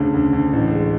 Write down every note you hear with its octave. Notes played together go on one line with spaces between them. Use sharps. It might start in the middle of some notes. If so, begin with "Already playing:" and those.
Already playing: D2 C#3 A3
D2
D2
A1
G#3